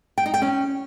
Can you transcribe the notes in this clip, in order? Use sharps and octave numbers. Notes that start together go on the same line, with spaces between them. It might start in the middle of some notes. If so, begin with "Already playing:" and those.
G5
D#4
G5
C#4